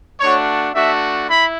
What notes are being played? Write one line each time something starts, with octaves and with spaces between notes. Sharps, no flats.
A3 D4 F#4 C#5
A3 D4 F#4 E5
E4 B5